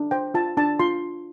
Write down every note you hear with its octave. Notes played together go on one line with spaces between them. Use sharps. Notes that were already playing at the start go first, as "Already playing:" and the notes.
Already playing: D4
C5 G5
F4 A5
D4 A5
F4 C6